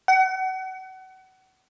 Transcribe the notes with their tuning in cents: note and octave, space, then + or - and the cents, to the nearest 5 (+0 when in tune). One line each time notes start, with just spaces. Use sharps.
F#5 +30